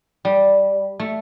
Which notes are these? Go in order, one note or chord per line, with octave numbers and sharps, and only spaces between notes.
G3
A3